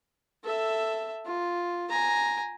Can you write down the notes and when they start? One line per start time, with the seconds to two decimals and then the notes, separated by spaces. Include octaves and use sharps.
0.44 A4 E5
1.26 F4
1.89 G#5 A#5